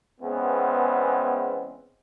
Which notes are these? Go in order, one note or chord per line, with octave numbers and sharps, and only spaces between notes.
E2 C#3 G#3 B3 C4